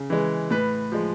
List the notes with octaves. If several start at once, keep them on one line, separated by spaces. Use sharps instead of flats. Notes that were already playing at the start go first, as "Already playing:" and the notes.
Already playing: C#3
E3 G#3
A2 B4
F3 G#3